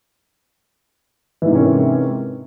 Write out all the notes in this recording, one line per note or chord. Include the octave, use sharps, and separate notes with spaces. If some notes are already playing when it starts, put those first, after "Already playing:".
G#2 C3 E3 A#3 C#4